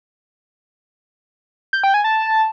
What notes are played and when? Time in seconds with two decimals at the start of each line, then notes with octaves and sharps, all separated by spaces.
1.73 G6
1.84 G5
1.94 G#5
2.04 A5